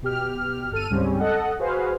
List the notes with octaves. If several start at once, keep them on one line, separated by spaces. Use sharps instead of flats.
B2 G4 F6
G1 A4 F6 D#7
D2 G#2 C#3 G3 C4 C#4
A4 D#5 F#5
F#4 G#4 B4 C5 F5